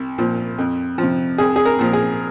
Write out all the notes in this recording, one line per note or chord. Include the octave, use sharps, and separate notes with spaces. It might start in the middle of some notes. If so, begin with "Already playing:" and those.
Already playing: C2
A#2 F3
F2
F3
C3
C2 G#4
G#4
A#4
A#2 F3
G#4